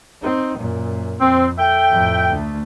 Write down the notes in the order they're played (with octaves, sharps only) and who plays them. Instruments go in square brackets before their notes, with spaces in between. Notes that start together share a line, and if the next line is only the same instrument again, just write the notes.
[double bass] C4 D#4
F#2 A#2
[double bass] F2 [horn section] C4
[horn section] A4 E5 G5
[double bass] F2 A2
D2 A3